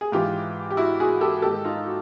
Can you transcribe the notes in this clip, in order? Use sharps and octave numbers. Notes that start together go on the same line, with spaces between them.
G#4
G#2 E3 F4 G4
G4
E4 F#4
F#4 G#4
G4 A4
G#2 D#3 G4 A4
D#4 F4
F#4